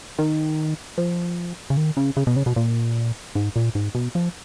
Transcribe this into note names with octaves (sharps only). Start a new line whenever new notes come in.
D#3
F3
C#3
D#3
C#3
C#3
B2
C#3
B2
A#2
G#2
A#2
G#2
B2
F3